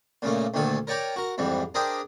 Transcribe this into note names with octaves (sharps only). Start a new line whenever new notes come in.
A#2 C#3 A3 A#3
D2 A#2 D#3 A4 G#5
A#4 C#5 D5 G5 G#5 A#5
F#4 A#4
F2 G#2 E3 G3
D4 G#4 A#4 C5 D#5 G5